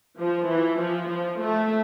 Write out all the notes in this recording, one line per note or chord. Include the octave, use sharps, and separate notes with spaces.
F3
E3
F3
F3
A3